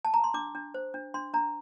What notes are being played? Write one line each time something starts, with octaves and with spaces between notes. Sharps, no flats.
A5
A#5
C6
D4 D6
D4
C5
D4
D4 C6
D4 A#5